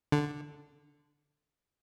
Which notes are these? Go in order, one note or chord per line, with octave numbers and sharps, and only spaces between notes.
D3